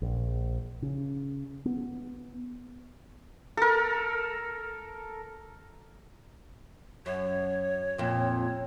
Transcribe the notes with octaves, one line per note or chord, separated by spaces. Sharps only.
A#1
C#3
B3
A4 A#4
F#2 C#5
F2 A#2